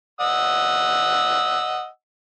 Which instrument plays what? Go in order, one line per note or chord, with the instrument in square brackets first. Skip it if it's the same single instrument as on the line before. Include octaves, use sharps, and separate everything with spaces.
[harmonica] D#5 F#5 E6